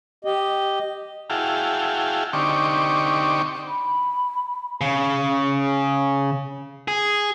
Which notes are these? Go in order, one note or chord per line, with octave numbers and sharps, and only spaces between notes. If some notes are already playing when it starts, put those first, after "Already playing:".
G4 D#5
E4 F#4 G#4 F5 G5 A5
D3 C4 D#4 G4 C#6 D6
B5
C#3
G#4